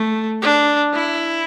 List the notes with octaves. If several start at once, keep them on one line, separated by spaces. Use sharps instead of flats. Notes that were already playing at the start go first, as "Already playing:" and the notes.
Already playing: A3
D4
E4